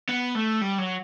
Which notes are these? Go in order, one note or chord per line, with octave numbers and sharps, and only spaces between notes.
B3
A3
G3
F#3